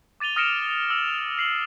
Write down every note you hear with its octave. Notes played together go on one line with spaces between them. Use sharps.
D6 A6 D#7 F7 G7
D#6 F6 A#6 C#7 D7 E7
E6 F7
F6 C7 F#7